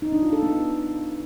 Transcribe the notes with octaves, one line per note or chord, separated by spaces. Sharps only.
D#4
D4
F4
A4
B3